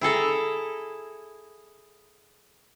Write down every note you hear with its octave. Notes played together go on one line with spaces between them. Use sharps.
E4 G#4 A4 A#5